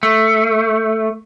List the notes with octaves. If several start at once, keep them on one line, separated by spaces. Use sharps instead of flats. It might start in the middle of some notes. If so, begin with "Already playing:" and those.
A3